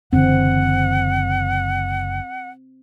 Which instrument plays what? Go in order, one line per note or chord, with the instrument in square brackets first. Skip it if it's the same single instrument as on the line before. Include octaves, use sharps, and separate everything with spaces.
[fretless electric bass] F#1 D3 E3 [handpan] C4 [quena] F#5